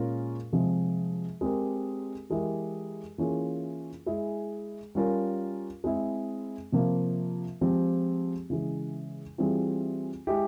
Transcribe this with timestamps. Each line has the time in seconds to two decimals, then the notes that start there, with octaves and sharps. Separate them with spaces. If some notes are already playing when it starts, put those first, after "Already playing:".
Already playing: A#2 G#3 C#4 F4 A#4
0.53 C3 F3 G#3
1.41 G#3 C4 G4 A#4
2.30 E3 G#3 E4 G4 A#4
3.18 E3 A#3 C#4 F4 G#4
4.06 G#3 E4 G#4
4.95 G3 C#4 F4 A#4
5.84 G#3 C4 E4
6.72 C3 F3 A#3 F4
7.61 F3 G#3 C4 G4
8.50 C#3 E3 G#3
9.38 E3 G3 C4 F4 G#4
10.27 G#3 E4 G4